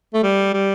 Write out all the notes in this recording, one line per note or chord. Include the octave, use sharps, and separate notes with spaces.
A3
G3
G3